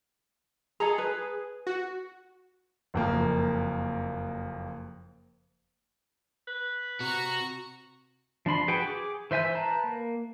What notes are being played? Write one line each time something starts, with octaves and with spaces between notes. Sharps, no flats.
G#4 A4 D#5 A#5
B4
F#4
F#1 F2 A#3
B4
C3 F#4 A#5 C#6
F3 D4 B5 C6
F#4 G#4 B4 F#5 G5
G#4 D6
E3 C5 E5 G#5 G6
B4 A5 A#5
A#3